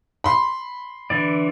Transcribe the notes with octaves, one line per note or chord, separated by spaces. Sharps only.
B5 C6
D3 E3 D5